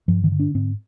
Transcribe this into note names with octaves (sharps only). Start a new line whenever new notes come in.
G2 F3
D#3
D3
D4
G#2 C4